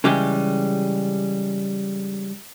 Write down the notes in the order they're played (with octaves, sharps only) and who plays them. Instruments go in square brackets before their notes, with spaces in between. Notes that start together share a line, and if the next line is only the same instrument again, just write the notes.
[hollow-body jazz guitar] C#3 E3 G3 G#3 C#4 G4